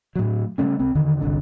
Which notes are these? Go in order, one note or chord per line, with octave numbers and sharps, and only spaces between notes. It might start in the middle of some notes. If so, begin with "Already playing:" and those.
A2 F#3
C#3 G3 A3 C#4
C2 C4
E2 D3 D#3
G1 C2 D3